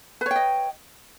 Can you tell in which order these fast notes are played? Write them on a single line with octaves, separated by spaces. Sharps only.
B4 C#5 G5 D#5